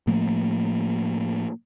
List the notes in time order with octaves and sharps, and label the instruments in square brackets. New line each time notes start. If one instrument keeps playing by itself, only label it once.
[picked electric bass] A2 F3 A3 A#3